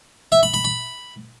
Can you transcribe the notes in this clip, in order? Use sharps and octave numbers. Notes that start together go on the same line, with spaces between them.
E5
B5
B5
B5